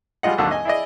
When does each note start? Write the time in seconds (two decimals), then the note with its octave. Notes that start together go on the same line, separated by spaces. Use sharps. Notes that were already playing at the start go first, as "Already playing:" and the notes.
0.23 G3 G#3 F4 D#5 F#5
0.38 G#1 D#2 D3 F#3 A5
0.51 D#5 G#5
0.65 E4 G#4 D5 D#5